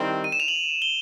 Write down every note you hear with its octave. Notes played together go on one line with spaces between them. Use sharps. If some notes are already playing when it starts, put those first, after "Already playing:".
Already playing: D#3 G3 C4 E4
D#7
E7
F7
F#7
G7